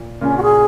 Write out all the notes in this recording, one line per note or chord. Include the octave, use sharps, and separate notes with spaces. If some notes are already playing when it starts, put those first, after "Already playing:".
Already playing: A#2
A#2 C#3 C#4
F#4
G#4